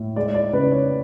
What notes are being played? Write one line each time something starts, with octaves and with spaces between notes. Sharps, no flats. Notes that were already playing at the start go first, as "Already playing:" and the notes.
Already playing: A2
G#3 D5
D5
C#3 B4
C#5